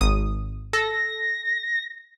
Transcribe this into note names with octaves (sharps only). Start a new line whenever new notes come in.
G#1 D#6
A4 A#6